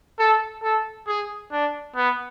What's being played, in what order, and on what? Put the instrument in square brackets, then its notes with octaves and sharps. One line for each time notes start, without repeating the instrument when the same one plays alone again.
[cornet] A4
A4
G#4
D4
B3